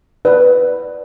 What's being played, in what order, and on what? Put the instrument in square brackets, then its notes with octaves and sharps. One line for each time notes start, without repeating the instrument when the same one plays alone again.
[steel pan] B4 [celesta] D5